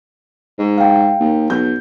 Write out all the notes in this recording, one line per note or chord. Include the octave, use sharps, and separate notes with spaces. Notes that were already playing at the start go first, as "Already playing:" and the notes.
G#2
F5 G5
D#2
B1 G6